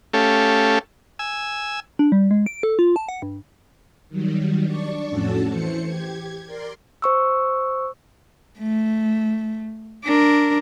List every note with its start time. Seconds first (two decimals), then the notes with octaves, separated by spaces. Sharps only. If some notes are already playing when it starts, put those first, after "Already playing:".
0.13 A3 C#4 G4 A4 F5
1.19 G#5 E6
1.99 D4
2.12 G3
2.31 G#3
2.46 D7
2.63 A4
2.79 F4
2.96 A5
3.09 F#5
3.22 G2
4.09 D#3 F#3 G3
4.65 D4 D5 C#6
5.09 F2 A2 C#4 F#4 A4 A5
5.48 E3 C5 C#7
5.84 G4 G#6
6.45 A#4 D5 C6
7.02 C5 C#6 E6
8.59 A3
10.05 D4 A#4